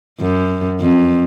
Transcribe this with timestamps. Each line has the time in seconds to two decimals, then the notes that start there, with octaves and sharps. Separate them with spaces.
0.21 F#2
0.80 F2